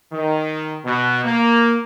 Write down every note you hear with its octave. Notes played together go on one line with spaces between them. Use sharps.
D#3
B2
A#3